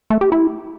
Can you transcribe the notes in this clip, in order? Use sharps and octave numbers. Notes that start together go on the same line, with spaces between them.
A3
G4
E4